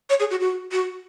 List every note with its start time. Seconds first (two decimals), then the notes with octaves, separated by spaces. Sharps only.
0.10 C#5
0.20 G#4
0.30 F#4
0.41 F#4
0.72 F#4